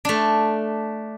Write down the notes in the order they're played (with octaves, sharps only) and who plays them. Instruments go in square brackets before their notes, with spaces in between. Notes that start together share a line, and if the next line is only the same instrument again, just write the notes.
[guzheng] A3 D4